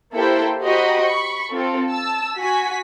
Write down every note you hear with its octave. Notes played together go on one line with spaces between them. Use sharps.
A#3 E4 G4 A4 C5 G5
F#4 G4 C5 D#5 A#5 B5
B5 C#6
C4 F4 A4
A5 E6
F#4 G#5 B6